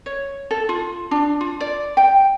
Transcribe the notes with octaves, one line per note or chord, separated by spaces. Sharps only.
C#5
A4
F4
D4
F4
D5
G5